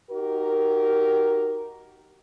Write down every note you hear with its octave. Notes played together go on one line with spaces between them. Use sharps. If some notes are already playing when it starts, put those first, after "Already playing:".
D#4 F#4 G4 A#4